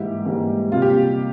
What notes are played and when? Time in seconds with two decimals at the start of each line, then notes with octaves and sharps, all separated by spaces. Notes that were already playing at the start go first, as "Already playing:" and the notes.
Already playing: G#2 E3 G3 A#3 E4 G4
0.25 G#2 E3 G3 A#3
0.72 C3 G3 A#3 F4
0.82 G4